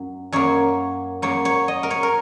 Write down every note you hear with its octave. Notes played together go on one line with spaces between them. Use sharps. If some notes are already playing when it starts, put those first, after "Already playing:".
Already playing: F#2 F#3
F#2 F#3 A#3 C#5
F#2 F#3 A#3 C#5
C#5
D#5
A#4
C#5
A#4